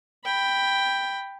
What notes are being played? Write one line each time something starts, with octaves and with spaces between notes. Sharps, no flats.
G5 B5